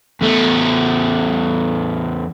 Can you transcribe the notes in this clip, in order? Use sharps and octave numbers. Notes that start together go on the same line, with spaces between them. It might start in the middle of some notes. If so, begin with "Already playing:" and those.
E2 A3